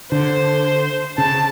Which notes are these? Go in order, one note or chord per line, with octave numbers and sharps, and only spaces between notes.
D3 C5
C#3 A5